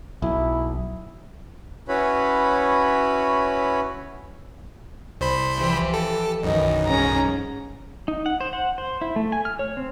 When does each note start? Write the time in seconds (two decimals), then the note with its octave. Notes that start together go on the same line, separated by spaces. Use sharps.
0.22 B1 E4
1.88 C#4 E4 F#4 B4 C#5 B5
5.21 C2 C5 B5
5.57 E3 F3 G4
5.94 A4
6.43 B1 F#2 D#3 E3 D#4
6.87 G#2 C#4 A#5
8.08 D#4
8.26 F#5
8.41 C5
8.53 F#5
8.78 C5
9.01 E4
9.16 A3
9.32 G#5
9.45 F6
9.59 C#5
9.77 C4